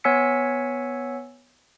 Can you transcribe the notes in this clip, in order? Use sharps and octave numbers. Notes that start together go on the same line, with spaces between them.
B3 C#5 G#5 E6 B6 C#7